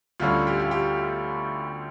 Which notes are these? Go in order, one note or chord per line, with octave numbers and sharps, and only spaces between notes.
D2 D3 G3 C#4 F4
G4
F4
G4